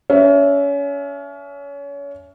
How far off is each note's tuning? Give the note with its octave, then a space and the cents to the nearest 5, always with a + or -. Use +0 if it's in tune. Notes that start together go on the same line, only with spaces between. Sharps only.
C#4 +30 E5 +15